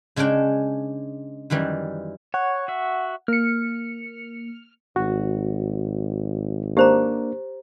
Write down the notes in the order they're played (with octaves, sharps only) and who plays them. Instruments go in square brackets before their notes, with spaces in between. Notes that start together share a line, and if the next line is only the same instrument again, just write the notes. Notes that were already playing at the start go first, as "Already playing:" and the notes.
[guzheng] C#3 G#3 C#4 D4 G5
F#2 D#3 E3 G3
[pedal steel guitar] C#5 [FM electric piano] F#5
[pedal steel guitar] F#4 E5
[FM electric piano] A#3 C#7 [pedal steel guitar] F6
[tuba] G#1 [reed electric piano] F#4
[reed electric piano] A#3 D4 [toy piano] G4 C5 A#5